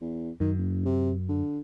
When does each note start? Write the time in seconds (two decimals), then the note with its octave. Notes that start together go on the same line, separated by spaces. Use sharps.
0.01 E2
0.40 F#2 D#3
0.58 F#1
0.85 C3
1.29 D3